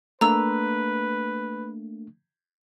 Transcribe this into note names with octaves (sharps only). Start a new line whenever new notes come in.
A3 A#3 D4 B4 A#5 E6